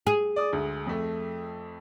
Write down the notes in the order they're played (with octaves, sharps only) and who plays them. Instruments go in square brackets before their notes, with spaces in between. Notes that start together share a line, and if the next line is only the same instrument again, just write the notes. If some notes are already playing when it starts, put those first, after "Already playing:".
[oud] G#4
[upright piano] D5 D#6
D2 G#3
F2 A3